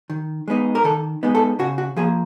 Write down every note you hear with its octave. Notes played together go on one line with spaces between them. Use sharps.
D#3
G#3 B3 D#4
A#4
D#3 A4
G#3 B3 D#4
A4
C#3 F#4
F#4
F3 A#3 G#4